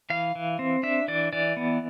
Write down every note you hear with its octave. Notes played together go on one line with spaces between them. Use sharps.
E3 F5
E3
C4
D4 E5
E3 D5
E3 D5
B3